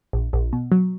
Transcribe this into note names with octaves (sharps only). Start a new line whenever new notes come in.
A#1
A#1
B2
F#3